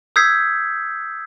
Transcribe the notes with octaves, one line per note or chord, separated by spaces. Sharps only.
D#6 E6 G6 G#6 B6 C7